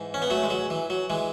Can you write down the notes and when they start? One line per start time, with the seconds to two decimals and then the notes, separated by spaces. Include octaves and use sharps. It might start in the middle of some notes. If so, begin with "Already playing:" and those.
Already playing: G#2 E3
0.14 C#4
0.22 B3
0.30 F#3 A3
0.43 G#3
0.50 F#3
0.70 E3
0.90 F#3
1.10 E3 G#3